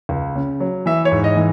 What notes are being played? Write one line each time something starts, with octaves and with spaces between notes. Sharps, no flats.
C#2
C#3
F#3
E3 E5
C#5
G#2
D#5
E3